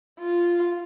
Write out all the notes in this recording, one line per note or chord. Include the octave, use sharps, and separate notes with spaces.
F4